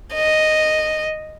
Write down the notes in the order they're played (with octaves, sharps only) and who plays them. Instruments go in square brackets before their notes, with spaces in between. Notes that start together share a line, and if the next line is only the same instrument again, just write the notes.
[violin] D#5